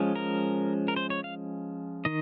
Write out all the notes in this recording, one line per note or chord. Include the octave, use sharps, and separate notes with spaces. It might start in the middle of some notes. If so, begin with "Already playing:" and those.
Already playing: F3 G#3 C#4
A#4
A#4
C5
C#5
F5
D#3 D#5